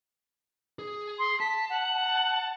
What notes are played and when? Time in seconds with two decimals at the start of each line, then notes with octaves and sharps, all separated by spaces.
0.79 G#4
1.19 C6
1.40 A5 B6
1.70 F#5